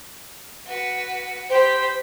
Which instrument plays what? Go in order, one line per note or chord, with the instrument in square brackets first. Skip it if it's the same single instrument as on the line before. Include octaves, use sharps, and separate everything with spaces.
[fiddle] F#4 B4
[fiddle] G4 B5 [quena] C5